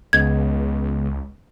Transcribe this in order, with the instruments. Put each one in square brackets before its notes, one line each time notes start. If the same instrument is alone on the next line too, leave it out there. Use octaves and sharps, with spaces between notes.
[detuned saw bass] C#2 [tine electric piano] C#3 G#3 B3 [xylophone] G#6